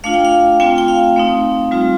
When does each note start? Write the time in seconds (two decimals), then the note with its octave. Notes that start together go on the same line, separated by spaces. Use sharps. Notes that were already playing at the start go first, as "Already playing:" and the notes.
0.04 A3 D4 F4 F5
0.14 G5
0.25 F5
0.60 A3 C4 F4 G5
0.78 G5
0.88 F5
1.16 A3 C4 D#4
1.71 G3 C4 F4